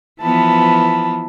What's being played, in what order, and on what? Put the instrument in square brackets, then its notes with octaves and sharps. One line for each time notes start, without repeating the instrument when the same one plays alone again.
[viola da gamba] E3 F3 B3 [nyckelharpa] A5 B5